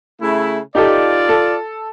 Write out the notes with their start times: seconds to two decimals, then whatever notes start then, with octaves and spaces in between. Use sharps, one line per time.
0.20 C#3 A3 E4
0.75 D#4 F4 G4 A4 D5
1.29 A4